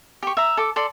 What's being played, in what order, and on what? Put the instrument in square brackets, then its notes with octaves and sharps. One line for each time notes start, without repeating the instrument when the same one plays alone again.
[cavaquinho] G4 C#6
E5 A#5
A4 D6
A4 D5 C6